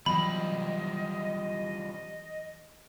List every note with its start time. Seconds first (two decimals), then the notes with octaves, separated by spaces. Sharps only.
0.06 E3 F#3 G3 B3 C4 F4 D#5 B5